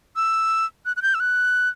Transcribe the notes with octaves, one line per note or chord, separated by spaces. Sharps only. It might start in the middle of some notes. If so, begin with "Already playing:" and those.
E6
F#6
F#6
G6
E6
F#6